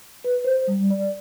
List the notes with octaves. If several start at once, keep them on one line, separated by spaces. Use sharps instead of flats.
B4
C5
G3
D5